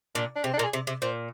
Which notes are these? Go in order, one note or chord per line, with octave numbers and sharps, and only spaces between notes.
A#2 D4
D4
C3 C4
D4
A#2 A#4
G#4
C3
C3
A#2 C5